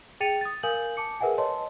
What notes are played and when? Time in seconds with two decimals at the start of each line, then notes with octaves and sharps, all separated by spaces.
0.20 G#4 G5 A6 C#7 D#7 F7
0.41 D#6 A6
0.63 A#4 F5 G#5 D#6 G6 F#7
0.97 A5 D6 C#7
1.20 G#4 A#4 B4 E5 F#5 G#5
1.38 B4 C#5 D#5 A5 C6